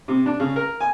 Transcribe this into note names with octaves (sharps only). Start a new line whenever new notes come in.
C3
D4
C#3
A#4
G#5